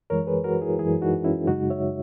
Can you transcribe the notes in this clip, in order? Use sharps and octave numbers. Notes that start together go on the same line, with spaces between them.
F#2 E3 G#3 A#4 C#5
G#4 B4
F#4 A#4
E4 G#4
F#2 E3 G#3 E4 G#4
D#4 F#4
C#4 E4
F#2 C#3 G#3 D#4 F#4
C#5 E5